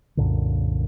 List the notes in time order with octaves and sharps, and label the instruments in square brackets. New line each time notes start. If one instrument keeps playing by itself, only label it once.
[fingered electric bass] C2 F#2 A#2 D3